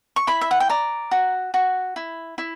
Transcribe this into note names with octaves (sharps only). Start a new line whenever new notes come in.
C#6
E4 B5
E5
F#5
G5
D5 A#5
F#4
F#4
E4
E4